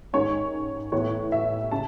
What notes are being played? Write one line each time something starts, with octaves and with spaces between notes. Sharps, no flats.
G#2 D#3 G#3 C#4 C#5
A2 E3 B3 C#5
E5
C#3 A5